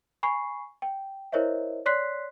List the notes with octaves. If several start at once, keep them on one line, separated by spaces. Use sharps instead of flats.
G#5 B5 C#6 C7
G5
E4 A#4 C5 C#5 D#5 E5
C#5 D5 C6 F#6 B6 C7